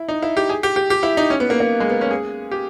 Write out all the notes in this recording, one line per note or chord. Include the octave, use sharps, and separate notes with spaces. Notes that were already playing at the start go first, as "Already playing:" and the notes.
Already playing: E4
D#4
E4
G4
G#4
G4
G4
G4
E4
D#4
C#4
B3
A#3
A#3
G#3
B3
C#4
G#4
G4